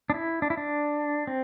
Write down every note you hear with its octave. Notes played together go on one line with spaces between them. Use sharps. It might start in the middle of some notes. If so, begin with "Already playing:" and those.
D4
E4
D4
E4
D4
C4